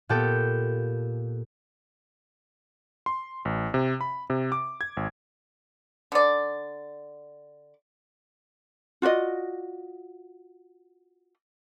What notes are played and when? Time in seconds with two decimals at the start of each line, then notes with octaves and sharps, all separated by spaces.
0.09 A#2 B3 G4 A4 G6
3.06 C6
3.45 A1
3.74 C3
4.01 B5
4.30 C3
4.52 D6
4.81 G#6
4.97 G#1
6.12 D3 D5
9.02 F4 F#4 D5 D#5